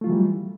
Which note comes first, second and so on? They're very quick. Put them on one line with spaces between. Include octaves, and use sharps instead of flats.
A3 F4 F#3 E3 G3